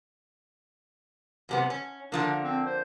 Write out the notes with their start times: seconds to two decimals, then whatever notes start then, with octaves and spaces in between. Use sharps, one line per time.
1.49 F#2 C3 B3
1.70 C#4
2.12 D3 F3 A#3 D4
2.44 C4
2.66 C5